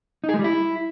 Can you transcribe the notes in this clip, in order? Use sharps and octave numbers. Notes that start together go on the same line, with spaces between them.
D#4
G#4
G#3
G3
E4